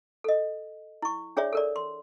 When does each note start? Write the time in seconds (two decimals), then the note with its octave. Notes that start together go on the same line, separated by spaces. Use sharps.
0.24 A4 D#5
1.02 E4 C#6
1.37 D4 G#4 C#5 D5 E5
1.53 A4 A#4 D5
1.76 C6